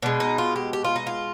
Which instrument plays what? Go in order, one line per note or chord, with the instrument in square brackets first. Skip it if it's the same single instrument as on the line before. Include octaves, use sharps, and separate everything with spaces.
[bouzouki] B2 G#3 D4
D#4
F4
G4
G4
F4
D#4
F4